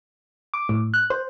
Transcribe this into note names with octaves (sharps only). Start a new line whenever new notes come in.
D6
A2
F#6
C5